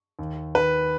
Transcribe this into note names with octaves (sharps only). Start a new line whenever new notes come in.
D#2
D#3 B4